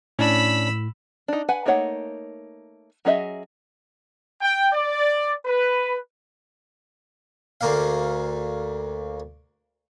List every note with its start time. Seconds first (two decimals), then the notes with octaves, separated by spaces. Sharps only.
0.19 A2 C#4 D4 B5 E6
1.28 D4 D#4
1.49 B4 F#5 G#5
1.66 A3 A#3 D#4 C#5 F#5
3.05 F#3 C#4 G#4 D#5 E5
4.41 G5
4.73 D5
5.46 B4
7.61 D2 A#3 F5